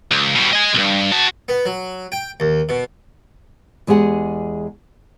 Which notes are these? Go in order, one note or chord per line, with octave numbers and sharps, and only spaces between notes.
C#2
B2 G3
D#5 G#5
B1 G2
F#4 A5
B3
F#3
G5
D#2
B2
E2 G#3 G4 G#4 F#5